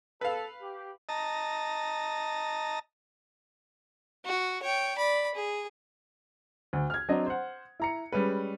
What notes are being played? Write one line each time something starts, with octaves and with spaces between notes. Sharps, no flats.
A4 B4 F5
G4
D#5 A5 A#5
F#4
C#5 G5
D5 B5
G#4
D2
F6 G#6
F#3 C4 D4 D#5
C5 F#5
E4 A#5 C#7
G3 G#3 C#4 B4